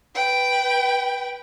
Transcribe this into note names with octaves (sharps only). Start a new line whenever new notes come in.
B4 G5